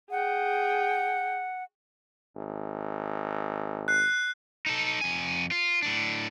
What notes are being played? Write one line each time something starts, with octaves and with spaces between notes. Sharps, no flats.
G#4 F#5 G5
G#1
F#6 C7
D#4 A4
F2 G#5
F4
A2 D4